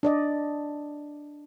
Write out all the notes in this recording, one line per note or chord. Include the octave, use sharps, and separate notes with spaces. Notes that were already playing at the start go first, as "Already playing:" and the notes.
D4 D5 D#5